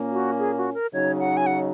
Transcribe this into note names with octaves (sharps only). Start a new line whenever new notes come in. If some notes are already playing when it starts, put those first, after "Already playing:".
Already playing: A#2 A#3 C#4
F#4
G#4
F#4
A#4
C#3 F#3 D#4 C#5
F#5
G#5
F#5